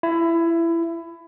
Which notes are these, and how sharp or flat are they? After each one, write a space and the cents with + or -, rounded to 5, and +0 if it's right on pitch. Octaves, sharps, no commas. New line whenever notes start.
E4 +20